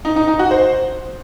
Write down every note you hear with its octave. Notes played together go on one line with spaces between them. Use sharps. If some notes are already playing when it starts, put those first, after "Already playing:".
D#4
D#4
D#4
F#4
C5